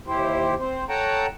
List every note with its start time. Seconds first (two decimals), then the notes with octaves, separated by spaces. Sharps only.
0.07 D#2 E4 G4 C5
0.60 C4 C5
0.89 A4 C#5 F#5 G5 A5 A#5